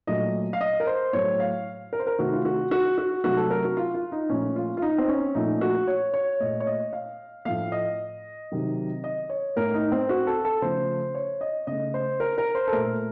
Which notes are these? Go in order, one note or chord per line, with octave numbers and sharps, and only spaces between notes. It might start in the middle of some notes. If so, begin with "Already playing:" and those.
A#2 F#3 A3 D#5
F5
D#5
A#4
C5
A2 F#3 A3 C#5
F5
A#4
C5
A#4
C3 D#3 A3 F#4
F4
F#4
F#4
F#4
C3 F#3 A3 F#4
A4
A#4
F#4
F4
F4
D#4
A#2 F3 A3 C#4
F4
F4
D#4
C4
C#4
A#2 F3 A3 D#4
F#4
C#5
C#5
A#2 A3 D#5
C#5
D#5
F5
A2 F3 A3 F5
D#5
C3 D#3 F#3
D#5
C#5
A2 A3 A#4
D#4
C4
F#4
A4
A4
C#3 F3 A3 C5
C#5
D#5
C#3 A3 D#5
C5
A#4
A#4
C5
A4
A#2 A3 A#4